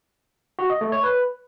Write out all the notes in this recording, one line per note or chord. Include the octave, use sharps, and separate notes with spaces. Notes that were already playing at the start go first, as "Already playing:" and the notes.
F#4
D#5
A3
C#5
B4